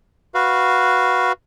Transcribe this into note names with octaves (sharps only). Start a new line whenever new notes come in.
F#4 B4 F5